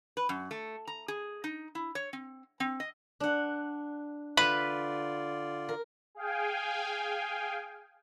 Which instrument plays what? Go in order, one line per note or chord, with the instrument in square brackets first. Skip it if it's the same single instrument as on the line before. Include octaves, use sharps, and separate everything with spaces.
[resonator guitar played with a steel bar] B4
F#2
A3
A#5
G#4
D#4
E4
C#5
C4
C4
D#5
[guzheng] D4 F#5
[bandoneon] D3 F4 D5 [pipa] B4 [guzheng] E5 F5 B5
[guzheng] A#4
[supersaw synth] G#4 F5 G5 G#5